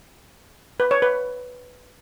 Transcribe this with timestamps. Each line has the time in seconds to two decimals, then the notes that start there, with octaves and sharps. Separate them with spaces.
0.80 B4
0.91 C#5
1.02 B4